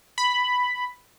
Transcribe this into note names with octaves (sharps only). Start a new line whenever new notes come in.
B5